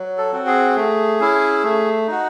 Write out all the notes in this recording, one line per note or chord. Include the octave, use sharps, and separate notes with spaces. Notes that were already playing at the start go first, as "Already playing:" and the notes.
Already playing: F#3
A4
C4 F#4
G#4
A3
C#4 E4
A3
D#4 F#4